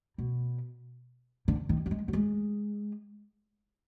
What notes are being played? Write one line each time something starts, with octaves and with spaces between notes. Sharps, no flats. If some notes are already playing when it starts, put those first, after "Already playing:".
B2
D3
D#3
F#3
G#3
F#3
G#3